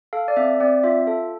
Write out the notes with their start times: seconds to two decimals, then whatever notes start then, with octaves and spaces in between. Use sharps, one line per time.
0.13 A4 F5
0.28 D5
0.37 C4 E5
0.60 C4 D5
0.83 F4 E5
1.07 A4